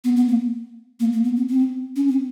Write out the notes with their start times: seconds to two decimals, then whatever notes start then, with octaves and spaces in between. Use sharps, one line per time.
0.04 B3
0.16 B3
0.29 A#3
1.00 A#3
1.13 A#3
1.24 B3
1.36 C4
1.49 C4
1.96 C#4
2.08 C4